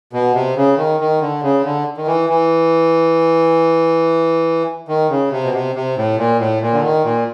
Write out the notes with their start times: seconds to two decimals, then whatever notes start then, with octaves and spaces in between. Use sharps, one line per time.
0.13 B2
0.35 C3
0.56 C#3
0.77 D#3
1.00 D#3
1.21 D3
1.43 C#3
1.64 D3
1.97 D#3
2.07 E3
2.29 E3
4.88 D#3
5.10 C#3
5.31 C3
5.43 B2
5.54 C3
5.76 C3
5.97 A2
6.18 A#2
6.39 A2
6.61 A#2
6.73 D3
6.83 D#3
7.04 A#2